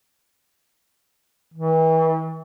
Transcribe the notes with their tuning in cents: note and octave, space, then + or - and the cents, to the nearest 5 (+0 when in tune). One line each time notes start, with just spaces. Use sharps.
E3 -35